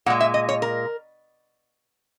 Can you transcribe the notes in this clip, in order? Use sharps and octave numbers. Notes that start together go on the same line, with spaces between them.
A#2 G#3 F#5
E5
D#5
C#5
A#4